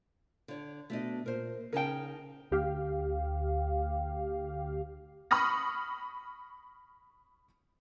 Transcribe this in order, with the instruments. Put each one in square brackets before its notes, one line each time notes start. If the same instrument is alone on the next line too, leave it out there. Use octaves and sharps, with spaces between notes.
[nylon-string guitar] D3 C#5
[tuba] B2 [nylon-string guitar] A3 D4 D#5
[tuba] A#2 [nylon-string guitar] A#4 C5
[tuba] C#3 [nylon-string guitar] C#4 D#4 A5 [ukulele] A#4 G5
[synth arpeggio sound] D2 G4 F5
[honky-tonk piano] B5 C#6 D#6 F6 A#6